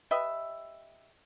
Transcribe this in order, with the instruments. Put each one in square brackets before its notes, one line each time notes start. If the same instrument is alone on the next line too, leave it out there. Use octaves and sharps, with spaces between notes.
[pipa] G4 B4 D#5 E5